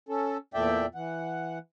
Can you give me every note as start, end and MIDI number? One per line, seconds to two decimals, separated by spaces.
0.09 0.37 61
0.09 0.37 69
0.54 0.86 40
0.54 0.86 46
0.54 0.86 57
0.54 0.86 74
0.54 0.86 76
0.54 0.86 79
0.95 1.58 52
0.95 1.58 78